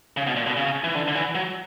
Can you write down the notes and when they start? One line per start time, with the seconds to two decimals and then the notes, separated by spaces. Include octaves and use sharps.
0.17 C#3
0.27 B2
0.36 A#2
0.47 B2
0.57 C#3
0.84 E3
0.95 D3
1.08 D3
1.15 E3
1.35 F#3